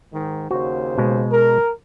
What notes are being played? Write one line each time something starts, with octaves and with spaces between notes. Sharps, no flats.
G#2 D#3
D#2 C#3 F#4 C5
B2 G#3
A#4